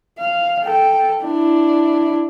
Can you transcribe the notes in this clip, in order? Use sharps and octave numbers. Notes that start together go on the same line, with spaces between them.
F5
A4 G5
D4 E4